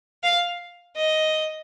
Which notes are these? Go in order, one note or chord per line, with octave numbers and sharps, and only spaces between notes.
F5
D#5